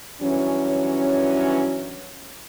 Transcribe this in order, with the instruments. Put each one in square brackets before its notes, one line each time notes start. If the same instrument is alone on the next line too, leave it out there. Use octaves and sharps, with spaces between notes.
[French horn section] G2 E3 F#3 C#4